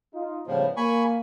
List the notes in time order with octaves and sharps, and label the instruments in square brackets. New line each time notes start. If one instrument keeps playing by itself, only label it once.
[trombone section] D#4 F4
[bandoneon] A2 F3 [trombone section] C#3 G3 B3
[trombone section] A#3 [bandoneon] G#5 B5 C#6